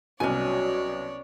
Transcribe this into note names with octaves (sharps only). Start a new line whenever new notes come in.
C2 B2 F#3 C#4 C#5 D5 G#5